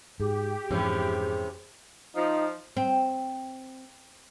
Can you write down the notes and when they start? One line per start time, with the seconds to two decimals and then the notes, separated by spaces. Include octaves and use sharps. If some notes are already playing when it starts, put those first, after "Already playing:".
0.20 G#2 G4 G#4
0.70 F2 G#2 C3 E3 C#4
2.15 F3 D#4
2.77 C4